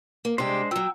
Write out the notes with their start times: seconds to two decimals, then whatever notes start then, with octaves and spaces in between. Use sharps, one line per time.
0.25 A#3
0.38 C3 G3 G#3 D4 G4 C5
0.71 F3 F#3 G5 E6